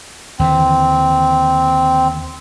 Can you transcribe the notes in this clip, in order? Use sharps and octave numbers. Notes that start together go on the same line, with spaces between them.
D#2 D3 E3 C4